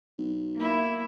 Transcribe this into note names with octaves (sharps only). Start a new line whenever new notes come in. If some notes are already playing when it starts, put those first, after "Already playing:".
B1
A#3 E4